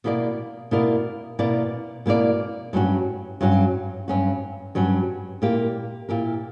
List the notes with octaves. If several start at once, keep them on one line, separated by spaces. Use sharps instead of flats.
B2 A#3 E4 A#4 D5
B2 A#3 E4 A#4 D5
B2 A#3 E4 A#4 D5
B2 A#3 E4 A#4 D5
G2 F#3 C#4 F#4
G2 F#3 C#4 F#4
G2 F#3 C#4 F#4
G2 F#3 C#4 F#4
A#2 A#3 E4 G4 A#4
A#2 A#3 E4 G4 A#4